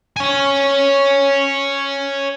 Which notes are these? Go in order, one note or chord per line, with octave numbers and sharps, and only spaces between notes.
C#5 G#5